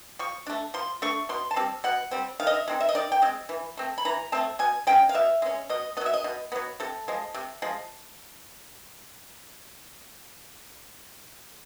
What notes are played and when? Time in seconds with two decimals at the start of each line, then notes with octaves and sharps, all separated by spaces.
0.19 F3 C#6
0.47 A3 D4
0.74 F3 C6
1.02 A3 D4 C#6
1.29 B2 C6
1.51 A5
1.56 G3 C4
1.84 B2 F#5
2.11 G3 C4
2.40 D#3 F5
2.47 D#5
2.54 E5
2.68 G#3 C4 D#4
2.81 E5
2.89 D#5
2.95 D#3 D5
3.12 G5
3.22 G#3 C4
3.49 E3
3.77 A3 C4
3.98 B5
4.05 E3 A#5
4.32 A3 C4 A5
4.59 B2 G#5
4.87 G#3 C#4 G5
5.09 F5
5.15 B2 E5
5.42 G#3 C#4
5.70 B2 D#5
5.97 B3 D#5
6.01 F#3 E5
6.14 D#5
6.24 B2
6.52 F#3 B3
6.80 C3 A4
7.08 F3 G#3
7.34 C3
7.62 F3 G#3